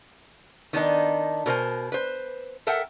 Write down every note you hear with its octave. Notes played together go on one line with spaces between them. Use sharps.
D#3 B3 D4 D#4
B2 A#4 C5 G#5
B4 C5
A4 A#4 E5 F#5 G5